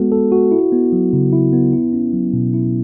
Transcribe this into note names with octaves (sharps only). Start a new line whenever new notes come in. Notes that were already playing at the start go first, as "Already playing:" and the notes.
Already playing: G#3 B3 F#4 A4
A4
F#4
E4
B3
F#3
C#3
E4
B3
E4
C#4
F#3
B2
E4